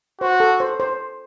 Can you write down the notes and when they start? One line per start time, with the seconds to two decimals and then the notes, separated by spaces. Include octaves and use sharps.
0.21 F#4 C5
0.40 A4
0.60 C5
0.80 C5